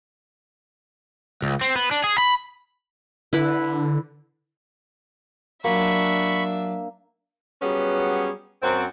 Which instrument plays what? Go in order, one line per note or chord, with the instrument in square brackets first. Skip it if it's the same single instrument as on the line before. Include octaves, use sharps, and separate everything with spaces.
[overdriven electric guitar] C#2
C4
B3
D4
G#4
B5
[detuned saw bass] D3 [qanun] E4 B4
[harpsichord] A#2 F#3 [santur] A#3 [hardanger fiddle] D4 E5 [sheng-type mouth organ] B5 C#6
[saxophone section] F#3 G3 B3 C#4 G#4 B4
F#2 C4 F#4